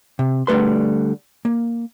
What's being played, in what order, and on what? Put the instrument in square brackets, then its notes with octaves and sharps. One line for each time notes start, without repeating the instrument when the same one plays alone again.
[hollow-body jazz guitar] C3
D3 G3 A3 B4 C6
A#3